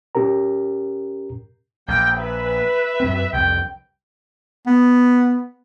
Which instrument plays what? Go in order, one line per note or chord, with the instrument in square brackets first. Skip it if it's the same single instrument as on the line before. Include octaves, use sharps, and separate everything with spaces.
[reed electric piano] C#4 G4 A#4 A#5
[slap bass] A#1 [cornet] A#3 [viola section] G5
[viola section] B4 [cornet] E5
[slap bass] F#2 C4
[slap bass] C2 F2 [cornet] G5
[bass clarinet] B3